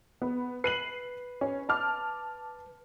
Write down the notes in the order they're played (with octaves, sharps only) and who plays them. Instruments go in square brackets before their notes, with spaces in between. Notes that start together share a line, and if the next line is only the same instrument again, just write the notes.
[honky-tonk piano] B3
[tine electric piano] B4 [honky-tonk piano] C7 D#7 F#7
[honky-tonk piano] C#4
A5 D6 F6